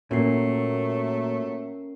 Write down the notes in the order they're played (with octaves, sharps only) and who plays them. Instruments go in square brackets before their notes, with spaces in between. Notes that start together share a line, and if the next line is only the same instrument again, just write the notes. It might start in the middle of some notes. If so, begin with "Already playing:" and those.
[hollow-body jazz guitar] A#2 [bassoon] F#3 [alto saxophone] A3 [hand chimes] C#4 A#4 C7